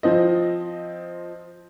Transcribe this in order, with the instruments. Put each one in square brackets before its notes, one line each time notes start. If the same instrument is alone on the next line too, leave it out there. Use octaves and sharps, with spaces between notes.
[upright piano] F3 C4 D#5